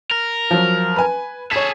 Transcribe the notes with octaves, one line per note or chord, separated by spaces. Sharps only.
A#4
F3 F#3
B4 G#5
G#4 A4 C#5 B6